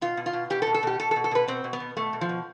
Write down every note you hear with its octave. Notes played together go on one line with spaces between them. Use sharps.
B2 F4
B2
F4
B2
B2 G4
A4
B2
A4
B2 G4
B2 A4
A4
B2
A4
B2 B4
B2 C4
B2
B3
B2
B2 A3
B2
F3
B2